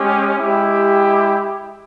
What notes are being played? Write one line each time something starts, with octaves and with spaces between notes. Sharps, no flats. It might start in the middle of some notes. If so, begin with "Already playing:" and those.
Already playing: G#3 C#4 G4
G#3 E4 G4